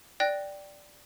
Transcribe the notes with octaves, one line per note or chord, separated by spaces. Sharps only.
D5 G5 F#6 A#6